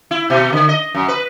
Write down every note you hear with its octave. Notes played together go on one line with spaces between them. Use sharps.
E4
B2
D3
D#5
F#2
B4